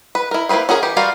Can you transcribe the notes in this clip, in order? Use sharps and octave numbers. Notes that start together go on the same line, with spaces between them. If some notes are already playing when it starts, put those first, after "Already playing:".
B4
E4 A#4
A#3 E4 F#4 B4 C5
C#4 F#4 G#4 A#4
E3 G4
G3 F4 F#4 A#4 F5